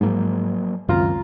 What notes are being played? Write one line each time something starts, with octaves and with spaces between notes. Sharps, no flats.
G#2 F3 F#3 A#3
C#2 F#2 D#3 C4 F4 A#5